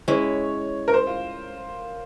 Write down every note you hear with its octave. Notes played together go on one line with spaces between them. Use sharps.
G#3 C#4 E4 C#5
A#4
C5
F4